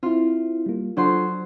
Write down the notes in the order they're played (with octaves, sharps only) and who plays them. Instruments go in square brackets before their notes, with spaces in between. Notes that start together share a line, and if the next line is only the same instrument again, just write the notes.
[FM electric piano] C4 E4 [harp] F4
[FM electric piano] G3 A#3
[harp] F#3 C5 C6 [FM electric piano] D4 F4 A4